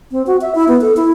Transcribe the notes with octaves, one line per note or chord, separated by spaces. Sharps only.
C4
F#4
E5
E4
B3
A4
E4